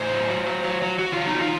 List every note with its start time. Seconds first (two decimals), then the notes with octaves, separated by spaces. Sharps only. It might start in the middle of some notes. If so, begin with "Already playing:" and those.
Already playing: A2 C5
0.11 F#3
0.29 F#3
0.46 F#3
0.64 F#3
0.82 F#3
0.99 F#3 F#4
1.13 F#3 F4
1.27 D#4
1.35 F#3
1.41 F4